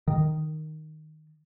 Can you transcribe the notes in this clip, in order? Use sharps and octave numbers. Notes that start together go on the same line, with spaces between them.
D#3